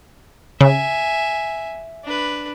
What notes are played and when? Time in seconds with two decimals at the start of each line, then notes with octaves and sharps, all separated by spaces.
0.61 C#3 E5 G#5
2.04 D4 B4